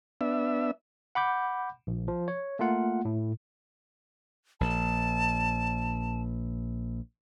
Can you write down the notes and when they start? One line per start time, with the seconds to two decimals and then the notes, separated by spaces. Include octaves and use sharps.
0.21 B3 D4 E5
1.15 F#5 B5 D6 G6
1.87 A#1
2.08 F3
2.28 C#5
2.59 A3 A#3 F4 F#5
3.05 A2
4.61 A#1 A5